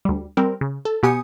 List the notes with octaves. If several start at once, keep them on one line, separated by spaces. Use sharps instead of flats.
D2 G3
G3 C4 A#4
C#3
A4
B2 B3 G4 G#5 D#6 C#7